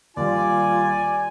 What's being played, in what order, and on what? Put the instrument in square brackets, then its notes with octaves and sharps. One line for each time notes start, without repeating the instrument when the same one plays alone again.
[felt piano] D#2 G3 [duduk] F4 [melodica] D5 [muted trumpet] G#5